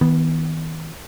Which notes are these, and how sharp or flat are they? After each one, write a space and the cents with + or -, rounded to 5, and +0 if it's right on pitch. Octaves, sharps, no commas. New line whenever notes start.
D#3 +45 B3 +0